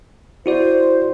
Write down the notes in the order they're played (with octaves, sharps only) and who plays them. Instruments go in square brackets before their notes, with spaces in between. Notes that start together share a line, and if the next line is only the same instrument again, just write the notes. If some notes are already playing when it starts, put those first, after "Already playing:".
[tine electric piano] E4 F#4 D5 [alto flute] C5